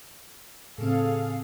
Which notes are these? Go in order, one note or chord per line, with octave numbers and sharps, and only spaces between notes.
A2 C#3 C4 G#4 A4 F5